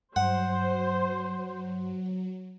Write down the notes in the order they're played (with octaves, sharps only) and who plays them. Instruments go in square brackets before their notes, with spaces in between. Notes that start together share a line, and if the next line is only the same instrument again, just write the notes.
[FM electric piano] G2 [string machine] F#3 [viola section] C5 [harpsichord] F#5